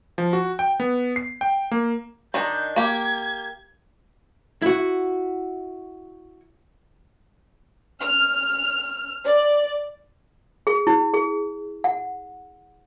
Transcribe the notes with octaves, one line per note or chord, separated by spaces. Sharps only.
F3
F#4
G5
B3
C7
G5
A#3
D#3 D4 D#4 G6
A#3 G4 G#6
E4 F#4
F6
D5
G#4
E4
G#4
F#5